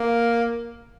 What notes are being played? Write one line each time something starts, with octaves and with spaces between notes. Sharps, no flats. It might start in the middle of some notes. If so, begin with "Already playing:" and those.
Already playing: A#3